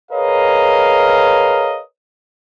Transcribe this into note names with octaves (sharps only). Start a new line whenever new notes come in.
G#4 A#4 B4 C#5 D#5 F5